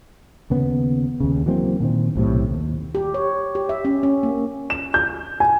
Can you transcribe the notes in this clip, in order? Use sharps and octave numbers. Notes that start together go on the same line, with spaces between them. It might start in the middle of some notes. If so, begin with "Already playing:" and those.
D#2 C#3 B3
D#2 C#3
E3 F#3 A#3 C4
A#2 D#3 C4
B1 A2 C3
D#2
G4
C#5
G4
E5
C#4
C#4
A#3
E7
G6
G#5